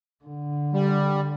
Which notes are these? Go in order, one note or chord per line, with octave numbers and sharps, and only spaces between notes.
D3
G3